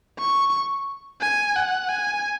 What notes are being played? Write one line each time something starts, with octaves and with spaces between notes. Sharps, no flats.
C#6
G#5
F#5
G#5